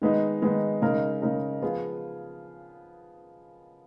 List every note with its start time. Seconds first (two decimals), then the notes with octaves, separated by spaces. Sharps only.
0.02 D#3 G#3 B3 D#4
0.42 D#3 G#3 B3 D#4
0.82 C#3 G#3 D#4 A#4
1.22 C#3 G#3 D#4 A#4
1.62 F3 B3 F4 G#4